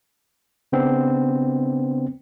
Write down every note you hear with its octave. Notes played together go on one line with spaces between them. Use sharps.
C#3 B3 C4 D4